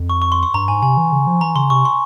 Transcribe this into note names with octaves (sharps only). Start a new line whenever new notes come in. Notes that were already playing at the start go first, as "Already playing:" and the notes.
Already playing: F2
C#6
C#6
C6
C6
G2 A#5
G#2 G#5
C3 G#5
E3
C#3
F3
E3 A#5
C#3 C6
C3 C#6
C6